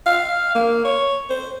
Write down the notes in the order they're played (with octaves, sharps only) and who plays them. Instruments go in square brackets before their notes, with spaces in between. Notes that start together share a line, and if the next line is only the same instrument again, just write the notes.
[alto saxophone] F5
A#3
C#5
C5